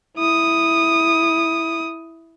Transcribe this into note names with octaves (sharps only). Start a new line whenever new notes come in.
E4 D#6